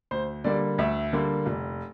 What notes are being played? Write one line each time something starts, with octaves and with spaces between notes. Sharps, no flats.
D2 C5
D3 G3 A#3 D5
D2 E5
D3 G3 A#3
F1